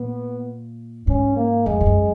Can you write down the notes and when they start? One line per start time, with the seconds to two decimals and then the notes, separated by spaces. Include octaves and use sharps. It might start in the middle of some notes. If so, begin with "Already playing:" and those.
Already playing: A#2 B3
1.07 G#2 C#4
1.37 A#3
1.66 F2 G#3
1.81 G#2
1.86 F#2